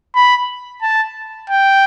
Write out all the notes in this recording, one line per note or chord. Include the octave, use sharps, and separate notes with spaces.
B5
A5
G5